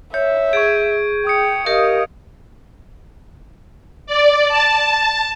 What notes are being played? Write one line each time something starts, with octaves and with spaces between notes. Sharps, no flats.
C#5 E5 G6
G#4 C#6 G#6 D7
G5 D#6 C#7
G4 A#4 D#5 F5
D5
A5